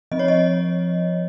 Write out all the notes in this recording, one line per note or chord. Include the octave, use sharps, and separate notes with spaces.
F3 C4 D#5
C#5
D#5